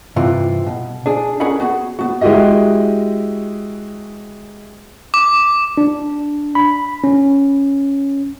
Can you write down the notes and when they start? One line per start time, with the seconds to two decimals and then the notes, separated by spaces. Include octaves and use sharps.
0.16 G2 C3 E3 F4
0.67 B2
1.06 D4 G#4
1.40 C#4 G#4 A#4 F#5 B5
1.60 B3 F#4 G#4
1.99 B3 F#4
2.21 G#3 E4 F#4 G4 D#5
5.14 D6
5.77 D4
6.55 B5
7.04 C#4